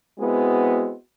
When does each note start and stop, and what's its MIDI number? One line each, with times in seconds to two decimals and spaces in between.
0.20 0.93 56
0.20 0.93 59
0.20 0.93 60
0.20 0.93 64
0.20 0.93 66